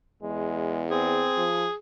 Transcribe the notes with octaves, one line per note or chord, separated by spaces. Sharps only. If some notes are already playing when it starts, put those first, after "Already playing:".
E2 G#3
C4 G#4
F3